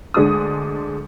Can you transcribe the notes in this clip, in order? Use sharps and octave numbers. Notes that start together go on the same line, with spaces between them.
D2 G#3 D4 D#6